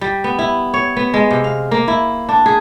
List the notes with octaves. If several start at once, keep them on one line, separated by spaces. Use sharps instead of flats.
G3
B3
E4
C#5
B3
G#3
C3
F5
A#3
E4
D4
G#4